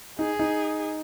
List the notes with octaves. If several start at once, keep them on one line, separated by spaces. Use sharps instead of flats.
D#4 G#4
D#4